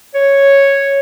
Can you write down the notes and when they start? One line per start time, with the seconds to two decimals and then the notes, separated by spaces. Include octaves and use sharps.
0.15 C#5